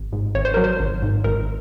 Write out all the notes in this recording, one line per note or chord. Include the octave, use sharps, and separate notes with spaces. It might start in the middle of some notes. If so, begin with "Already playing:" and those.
Already playing: G#1
G#2
G#1 C#5
C5
F#3 A#4
C5
G#1
G#2
G#1 A#4